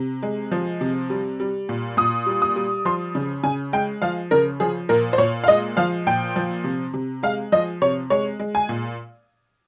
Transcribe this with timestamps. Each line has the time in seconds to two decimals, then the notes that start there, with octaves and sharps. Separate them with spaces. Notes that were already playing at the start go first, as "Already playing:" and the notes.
Already playing: C3
0.23 G#3
0.51 F3
0.81 C3
1.10 G3
1.40 G3
1.69 A#2
1.97 A#2 D#6
2.27 G3
2.42 D#6
2.56 G3
2.85 F3 C6
3.15 C#3
3.43 C#3 G#5
3.73 G#3 G5
4.02 F3 F5
4.31 C#3 A#4
4.60 F3 G#4
4.89 A#2 A#4
5.13 C5
5.18 A#2 C#5
5.44 F5
5.48 G#3 D#5
5.77 F3 F5
6.07 A#2 G5
6.36 F3
6.64 C3
6.94 C3
7.23 G#3 F5
7.52 F3 D#5
7.82 C3 C#5
8.10 G#3 C#5
8.40 G#3
8.55 G#5
8.69 A#2